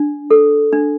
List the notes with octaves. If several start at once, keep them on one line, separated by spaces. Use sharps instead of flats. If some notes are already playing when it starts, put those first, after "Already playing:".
Already playing: D4
A4
D4